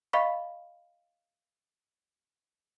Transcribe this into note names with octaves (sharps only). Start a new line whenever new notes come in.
D#5 F5 B5 C#6